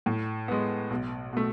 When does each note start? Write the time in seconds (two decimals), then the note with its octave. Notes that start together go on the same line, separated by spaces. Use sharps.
0.06 A2
0.48 G#3 B3
0.90 B1
1.33 B2 A3